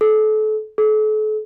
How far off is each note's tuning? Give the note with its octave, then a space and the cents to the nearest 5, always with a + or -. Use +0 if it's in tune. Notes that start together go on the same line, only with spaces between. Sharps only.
A4 -30
A4 -40